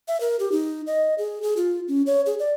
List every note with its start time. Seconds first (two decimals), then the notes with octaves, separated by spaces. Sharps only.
0.08 E5
0.20 A#4
0.39 G4
0.52 D#4
0.87 D#5
1.18 G#4
1.42 G#4
1.57 F4
1.88 C#4
2.07 C#5
2.26 G#4
2.39 D5